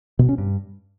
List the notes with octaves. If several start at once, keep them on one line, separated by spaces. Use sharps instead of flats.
B2
C#4
G2